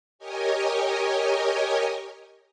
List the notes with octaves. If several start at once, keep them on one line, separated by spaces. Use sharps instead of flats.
G4 A#4 C#5 D#5 G#5